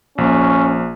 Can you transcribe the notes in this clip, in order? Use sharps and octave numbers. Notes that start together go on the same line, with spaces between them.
A#1 C#4